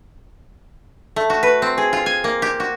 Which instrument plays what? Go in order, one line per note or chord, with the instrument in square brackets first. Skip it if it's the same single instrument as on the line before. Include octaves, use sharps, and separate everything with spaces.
[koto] A3
F#4
B4
C4
G#4
F4
G#5
A#3
G4
F#4